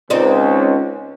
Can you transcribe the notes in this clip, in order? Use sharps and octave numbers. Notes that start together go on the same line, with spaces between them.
C#2 C4 D#4 D5